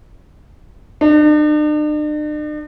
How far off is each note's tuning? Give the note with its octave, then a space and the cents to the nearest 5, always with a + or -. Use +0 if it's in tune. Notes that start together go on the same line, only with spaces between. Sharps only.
D4 +45